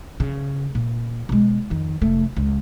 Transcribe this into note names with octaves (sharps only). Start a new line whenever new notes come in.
C#3
A#2
B2 G#3
F2 D#3
F1 A3
C#2